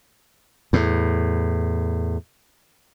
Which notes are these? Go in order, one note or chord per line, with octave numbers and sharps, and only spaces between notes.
E2 A2